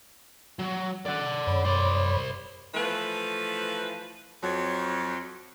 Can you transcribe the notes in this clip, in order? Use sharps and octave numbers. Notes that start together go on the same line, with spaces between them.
F#3
D5 F#5
F#2 C#5 B5
C5 D5
E3 F3 A3 B4
F2 F#3